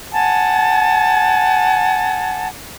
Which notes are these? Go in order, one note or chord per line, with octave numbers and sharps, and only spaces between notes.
F#5 G#5 A5